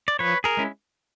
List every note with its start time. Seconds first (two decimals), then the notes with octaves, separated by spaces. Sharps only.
0.08 D5
0.19 F3 B4 C#5
0.44 G#4 A#4
0.57 G#3 C#4 E4